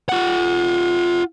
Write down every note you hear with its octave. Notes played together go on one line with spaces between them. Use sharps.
F4 F#5